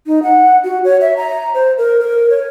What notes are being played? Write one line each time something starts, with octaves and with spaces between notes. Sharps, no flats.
D#4
F#5
F#4
C#5
E5
A#5
C5
A#4
A#4
C#5